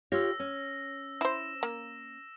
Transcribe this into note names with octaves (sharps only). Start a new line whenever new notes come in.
F4 G4 C#5 E6 A#6
C#4
E4 C5 E7
A#3